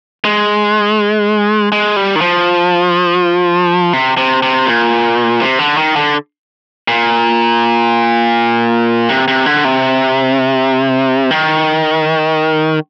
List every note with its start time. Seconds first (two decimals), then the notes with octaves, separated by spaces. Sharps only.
0.25 G#3
1.72 G#3
1.96 G3
2.16 D#3
2.21 F3
3.93 C3
4.17 C3
4.42 C3
4.67 A#2
5.40 C3
5.59 D3
5.77 D#3
5.96 D3
6.88 A#2
9.09 C3
9.28 C3
9.46 D3
9.65 C3
11.31 D#3